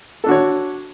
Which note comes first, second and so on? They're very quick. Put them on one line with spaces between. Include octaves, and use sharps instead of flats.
A4 D4 F#4 C#5